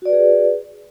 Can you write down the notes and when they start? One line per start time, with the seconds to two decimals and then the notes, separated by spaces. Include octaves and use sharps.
0.02 F#4
0.05 D5
0.09 B4
0.13 G#4